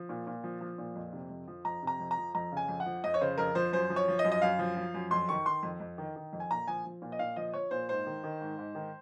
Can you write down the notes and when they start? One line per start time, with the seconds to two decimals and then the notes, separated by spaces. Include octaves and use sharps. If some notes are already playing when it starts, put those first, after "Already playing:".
Already playing: F3
0.09 A#2
0.27 A#2
0.44 F3
0.61 F3
0.78 A#2
0.96 F2
1.13 C3
1.30 F2
1.47 F3
1.65 F2 A#5
1.82 C3 A#5
2.00 F2
2.11 A#5
2.17 F3
2.35 F2 A#5
2.52 C#3 G#5
2.68 F2
2.80 F#5
2.86 F3
3.04 F2 D#5
3.14 C#5
3.21 C#3 C5
3.38 F2 A#4
3.55 F3 C5
3.72 F#2 C5
3.90 F3
3.96 C#5
4.08 F3
4.19 D#5
4.24 F#2
4.32 D#5
4.42 F#2 F5
4.59 F3
4.77 F3
4.94 F#2
5.11 F2 C6
5.29 D#3 C#6
5.46 D#3 C6
5.63 F2
5.80 F2
5.98 D#3
6.16 D#3
6.33 F2
6.40 G#5
6.50 A#2 A#5
6.67 F3 G#5
6.85 F3
7.02 A#2
7.12 D#5
7.19 A#2 F5
7.36 F3 D#5
7.54 F3 C#5
7.71 A#2 C5
7.89 G#2 C5
8.06 D#3
8.24 D#3
8.41 G#2
8.58 G#2
8.75 D#3